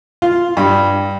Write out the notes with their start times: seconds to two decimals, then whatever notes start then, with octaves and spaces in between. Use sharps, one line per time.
0.22 F4
0.57 G2